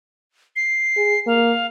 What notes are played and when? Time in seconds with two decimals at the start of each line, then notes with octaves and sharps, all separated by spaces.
0.56 C7
0.97 G#4
1.27 A#3 F5